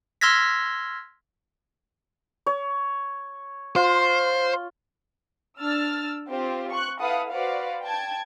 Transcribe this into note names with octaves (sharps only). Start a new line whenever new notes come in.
C6 E6 F6 G#6 A#6 B6
C#5
F4 C5
D4 E6 F6 A6
C4 F4 G4 C5
C#6 F#6
E4 A4 B4 F5 F#5 D#6
F#4 B4 C5 D5 F5 F#5
G5 A5 G#6